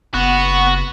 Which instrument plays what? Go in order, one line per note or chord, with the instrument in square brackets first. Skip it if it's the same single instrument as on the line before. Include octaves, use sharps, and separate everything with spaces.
[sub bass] F#1 [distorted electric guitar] B3 [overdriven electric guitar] F#4